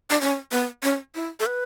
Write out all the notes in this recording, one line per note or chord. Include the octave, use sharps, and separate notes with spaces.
D4
C#4
B3
C#4
E4
A4
B4